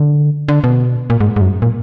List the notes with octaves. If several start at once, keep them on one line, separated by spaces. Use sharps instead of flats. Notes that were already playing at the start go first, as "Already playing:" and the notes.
Already playing: D3
D3
B2
A#2
G#2
G#2
F#2
A#2